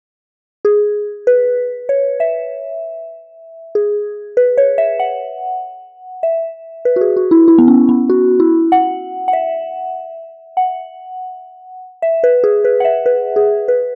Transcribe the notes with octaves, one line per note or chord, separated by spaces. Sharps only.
G#4
B4
C#5
E5
G#4
B4
C#5
E5
F#5
E5
B4
F#4
G#4
F#4
E4
E4
B3
C#4
B3
F#4
E4
F#5
F#5
E5
F#5
E5
B4
G#4
B4
F#5
E5
B4
G#4
B4